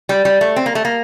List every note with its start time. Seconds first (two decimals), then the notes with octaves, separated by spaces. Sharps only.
0.09 G3
0.25 G3
0.41 A3
0.56 C4
0.66 A#3
0.75 A3
0.85 A#3